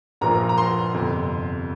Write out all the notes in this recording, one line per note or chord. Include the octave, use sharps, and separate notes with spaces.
A#1 A#2 F3 A#3 A#5
A#5
C6
G1 F2 C3